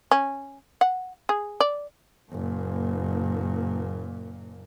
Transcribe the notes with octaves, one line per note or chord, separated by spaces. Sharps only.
C#4
F#5
G#4
D5
F#1 A#2